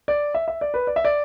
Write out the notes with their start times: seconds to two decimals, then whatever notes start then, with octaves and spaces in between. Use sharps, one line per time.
0.08 D5
0.35 E5
0.48 E5
0.61 D5
0.74 B4
0.87 D5
0.96 E5
1.05 D5